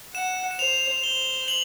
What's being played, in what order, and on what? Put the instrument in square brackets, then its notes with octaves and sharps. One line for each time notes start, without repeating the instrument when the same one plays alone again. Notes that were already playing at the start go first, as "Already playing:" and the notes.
[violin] F#5 [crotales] E7
[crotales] E7
[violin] C5 [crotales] F7
[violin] C5 [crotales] G7
[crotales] F#7